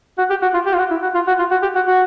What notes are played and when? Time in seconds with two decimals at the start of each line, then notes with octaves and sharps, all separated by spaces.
0.18 F#4
0.30 G4
0.42 F#4
0.54 F4
0.66 G4
0.74 F4
0.78 F#4
0.91 E4
1.02 F#4
1.14 F4
1.27 F#4
1.39 F4
1.51 F#4
1.63 G4
1.75 F#4
1.87 F#4